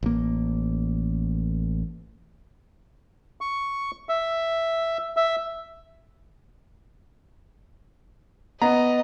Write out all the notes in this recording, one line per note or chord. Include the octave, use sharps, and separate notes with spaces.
A1 A#3
C#6
E5
E5
B3 D#5 A#5